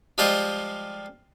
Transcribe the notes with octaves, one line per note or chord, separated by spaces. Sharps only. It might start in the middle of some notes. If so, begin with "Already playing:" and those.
F3 G3 G#3 F4 C5 D#5